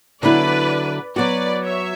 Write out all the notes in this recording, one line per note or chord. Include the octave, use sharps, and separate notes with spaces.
D3 F#3 B3 E4 B4 D5
F#3 B3 F#4 B4 D5
C#5 E5